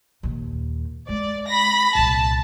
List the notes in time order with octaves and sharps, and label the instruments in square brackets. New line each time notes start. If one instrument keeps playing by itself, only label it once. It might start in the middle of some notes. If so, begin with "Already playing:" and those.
[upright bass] D#2 A#2
[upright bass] G#3 [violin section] D5
[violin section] B5 A#6
[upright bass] C2 A#2 [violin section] A5